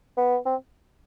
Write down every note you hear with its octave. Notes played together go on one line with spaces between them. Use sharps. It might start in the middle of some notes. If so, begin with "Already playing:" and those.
B3
C4